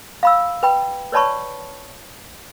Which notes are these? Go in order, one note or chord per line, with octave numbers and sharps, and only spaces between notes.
F5 B5 E6
B4 G5 B5
B4 C#5 D5 A5 B5 C#6